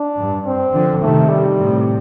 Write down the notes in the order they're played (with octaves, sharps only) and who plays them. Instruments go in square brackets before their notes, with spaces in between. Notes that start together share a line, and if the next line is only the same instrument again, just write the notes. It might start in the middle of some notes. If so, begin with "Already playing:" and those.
Already playing: [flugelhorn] D4
[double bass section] G2
[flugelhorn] C4
[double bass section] D3 F3
[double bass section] C3 D#3 [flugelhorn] A3
[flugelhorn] G3
[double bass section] A2 C3